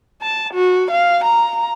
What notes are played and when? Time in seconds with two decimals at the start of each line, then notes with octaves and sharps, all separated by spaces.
0.22 A5
0.54 F#4
0.91 F5
1.24 A#5